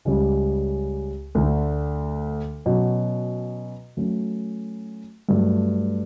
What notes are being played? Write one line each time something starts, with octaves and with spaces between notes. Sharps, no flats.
C#2 C#3 G3 C#4
D2 D3 A3 D4
B2 F#3 C#4
F#3 A3 C#4
G2 F#3 A3